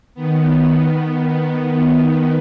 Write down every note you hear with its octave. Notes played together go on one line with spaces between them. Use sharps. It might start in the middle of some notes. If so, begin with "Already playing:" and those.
D#3 B3